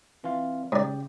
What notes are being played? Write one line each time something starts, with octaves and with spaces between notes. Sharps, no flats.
E3 C4 F4 F5
G#2 C#3 G4 D5